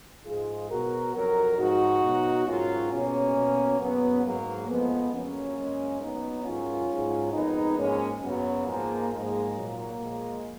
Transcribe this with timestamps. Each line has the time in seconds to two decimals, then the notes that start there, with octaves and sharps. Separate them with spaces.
0.25 G#2 F3 G#3 F4 G#4
0.69 B2 F#3 F#4 A#4
1.13 F2 D#3 F#3 F#4 A#4
1.58 G#2 F3 G#3 D#4 F#4
2.02 B2 F#3
2.46 G#2 D#3 F#3 C#4 F4
2.90 B2 G#3 A#3 C#4
3.35 B2 F#3
3.79 F#2 C#3 F#3 B3
4.24 G#2 F#3 A#3
4.68 F2 F3 G#3 B3
5.12 F2 C#3 F#3 A#3 C#4
5.56 F#2 C#3 G#3
6.00 B2 F#3 B3 D#4
6.45 G#2 D#3 F#3 C#4 F4
6.89 G#2 F#3
7.33 F2 D#3 G#3 B3 D#4
7.77 G#2 F3 G#3 A#3 C#4
8.22 F#2 C#3 F#3 B3
8.66 G#2 F3 G#3 A#3
9.10 G#2 F3 G#3 A#3
9.54 A#2 F#3
9.99 A#2 F3 G#3